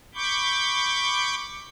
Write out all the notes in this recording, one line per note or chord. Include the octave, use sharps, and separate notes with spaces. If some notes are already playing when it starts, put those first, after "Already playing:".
B5 C#6 D6 G6